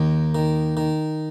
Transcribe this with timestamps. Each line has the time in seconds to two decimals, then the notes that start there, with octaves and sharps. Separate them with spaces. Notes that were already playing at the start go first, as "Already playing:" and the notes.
Already playing: D#2 D#3
0.35 D#3
0.77 D#3